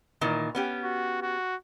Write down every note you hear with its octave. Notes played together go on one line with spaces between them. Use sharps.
A#2 D#3 E3
B3 C#4 G4
F#4
F#4